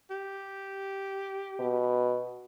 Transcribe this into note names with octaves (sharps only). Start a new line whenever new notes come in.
G4
B2